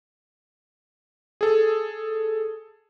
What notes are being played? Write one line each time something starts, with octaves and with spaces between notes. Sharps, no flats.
G#4 A4